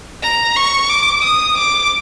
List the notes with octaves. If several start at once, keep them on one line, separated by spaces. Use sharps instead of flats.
A#5
C#6
D6
D#6
D6